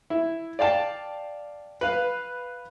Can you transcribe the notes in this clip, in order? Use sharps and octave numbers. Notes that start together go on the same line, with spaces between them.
E4
D5 F5 G5 A5
B4 F5